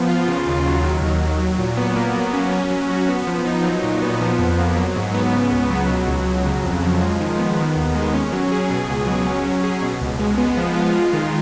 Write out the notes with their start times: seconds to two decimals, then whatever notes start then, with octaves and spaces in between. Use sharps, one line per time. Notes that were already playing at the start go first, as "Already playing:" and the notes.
Already playing: F3 B3
0.09 F4
0.28 C#3
0.46 D#2
0.66 F#3
0.83 D#3
1.02 D#2
1.21 F#3
1.40 F#3
1.58 A#2
1.77 B3
1.96 A#3
2.15 F#3
2.33 C#4
2.52 C#4
2.70 F#3
2.90 F#4
3.09 B3
3.27 F3
3.45 D#4
3.64 F#3
3.83 A#2
4.02 B3
4.21 F3
4.39 F2
4.58 A#3
4.76 F#3
4.96 G#2
5.14 B3
5.33 C#3
5.51 C#2
5.70 F#3
5.89 B2
6.08 C#2
6.27 F#3
6.45 C#3
6.64 F2
6.82 F3
7.01 G#3
7.20 D#3
7.39 B3
7.58 D#3
7.76 D#2
7.95 G#3
8.14 C#4
8.33 F#3
8.52 G#4
8.70 B2
8.89 C#2
9.07 F#3
9.26 C#4
9.45 F#3
9.64 G#4
9.82 B2
10.01 C#2
10.19 G#3
10.38 B3
10.57 F3
10.75 F4
10.94 G#3
11.13 D#3